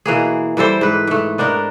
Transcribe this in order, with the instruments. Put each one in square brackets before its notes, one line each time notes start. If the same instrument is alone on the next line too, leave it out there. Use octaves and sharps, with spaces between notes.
[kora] B2 E3 A#3 G#4
E3 G3 A4 C5
G#2 B4
G#2 A3
B3 D4 D#4 A#4